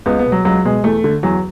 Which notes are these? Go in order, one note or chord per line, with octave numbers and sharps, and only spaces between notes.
C#2 B3
B3
B2
F#3
C#2 F#3
B2 G#3
E2 A3
D3
E2 F#3